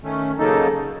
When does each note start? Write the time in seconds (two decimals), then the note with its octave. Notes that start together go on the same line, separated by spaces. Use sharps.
0.03 D#3 A3 C#4
0.38 C#3 F#3 A#3 D#4 A4